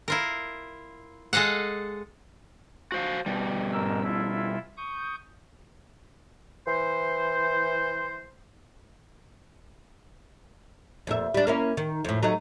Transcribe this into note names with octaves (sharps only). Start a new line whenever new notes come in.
E4 F4 A#4
G#3 A4 D#5 F5 F#5
F#4 C5 F5
B2 G3
G#2 A#4 E6
E4 F4 E5
C#6 D#6 G6
E3 C5
F2 A#2 E5
G3 D4
A#3 C#4 E4
D#3
F2 A2
F#3 A3 D#4